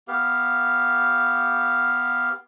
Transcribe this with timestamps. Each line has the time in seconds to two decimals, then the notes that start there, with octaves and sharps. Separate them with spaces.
0.08 B3 G4 F5